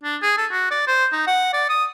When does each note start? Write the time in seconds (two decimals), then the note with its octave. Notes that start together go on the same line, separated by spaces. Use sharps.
0.04 D4
0.22 G#4
0.38 A4
0.51 F#4
0.71 D5
0.87 C5
1.12 D#4
1.27 F#5
1.53 D5
1.69 D#6